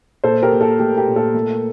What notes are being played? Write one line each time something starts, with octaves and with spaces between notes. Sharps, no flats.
A#2 A4 C5
G4 A#4
A#2
A4
A3 G4
G4
A#2
A4
A3